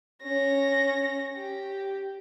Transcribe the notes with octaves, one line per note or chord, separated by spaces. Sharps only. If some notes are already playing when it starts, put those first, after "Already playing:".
C#4 A#6
G4